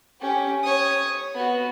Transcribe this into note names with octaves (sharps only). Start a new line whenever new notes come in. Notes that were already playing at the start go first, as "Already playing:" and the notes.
C#4 G4
C#5 D#6
B3 F#4